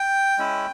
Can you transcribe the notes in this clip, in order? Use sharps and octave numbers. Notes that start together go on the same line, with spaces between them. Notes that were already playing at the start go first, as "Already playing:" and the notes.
Already playing: G5
G#3 C#4 E4